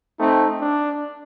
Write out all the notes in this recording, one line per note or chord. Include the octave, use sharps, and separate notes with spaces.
A3 C4 D#4
D4